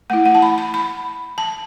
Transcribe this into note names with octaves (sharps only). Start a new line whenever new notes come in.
A3 E4 F#5
F#5
A5
B5
B5
B5
A5